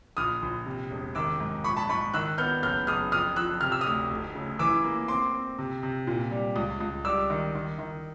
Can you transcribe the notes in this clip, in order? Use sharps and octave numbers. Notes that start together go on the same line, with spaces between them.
A#1 D#6 F6
A#1
C3
E1
D#3 D6 E6
G#2
A#1 B5 C#6
A5 B5
G#2 B5 C#6
D#3 E6 F#6
B3 F6 G6
F#1 F6 G6
F#1 D#6 F6
F2 D#6 F6
F3 E6 F#6
C3 F6
E6
D#6 F6
D2
F1
C#3
E3 D6 E6
A#3
C4 C6 D6
C4
C3
C3
A#2
G3
C#2
C#2
G3 D6 E6
D#3
D#3
D#3